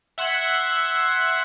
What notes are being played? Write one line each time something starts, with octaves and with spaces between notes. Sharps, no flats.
E5 F#5 C6 F#6 G#6